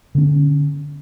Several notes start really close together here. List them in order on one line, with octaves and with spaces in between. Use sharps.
D3 C4 C#4